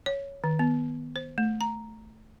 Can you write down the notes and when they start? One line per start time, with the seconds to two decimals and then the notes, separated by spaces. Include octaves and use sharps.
0.06 C#5
0.44 D#3
0.59 B3
1.16 C5
1.38 A3
1.61 A#5